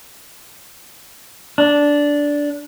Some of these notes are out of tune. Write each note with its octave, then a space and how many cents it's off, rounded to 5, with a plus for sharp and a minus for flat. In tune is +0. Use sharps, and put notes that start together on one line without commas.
D4 -10